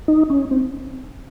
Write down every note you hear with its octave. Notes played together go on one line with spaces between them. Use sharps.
D#4
C#4
C4